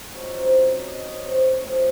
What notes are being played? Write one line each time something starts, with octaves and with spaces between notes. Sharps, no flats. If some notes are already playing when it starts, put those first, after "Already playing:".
C#3 F3 C4 D#4 F#4
C5
C#5
D#5
C#5
C5
C#5
C3 F3 A3 C4 C#5